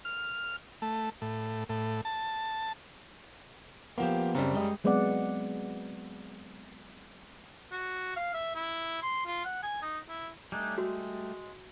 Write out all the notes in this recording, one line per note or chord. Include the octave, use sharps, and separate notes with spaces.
F6
A3
A2
A2
A5
F3 A#3 B3 G4
F#2 C#3 G3 C4 D4
G#3 G4 D#5
F#3 G#3 B3 C4 D5 F#5
F#4
F5
E5
E4
C6
F4
F#5
G#5
D#4
E4
G3 A3 D4 D#4 G#5
G#3 F#4